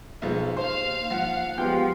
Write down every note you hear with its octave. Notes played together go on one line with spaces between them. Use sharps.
B1 F3 G#3
D#2 C5 F5
F3 F#5
F3 G#3 B3 F4 G4 G5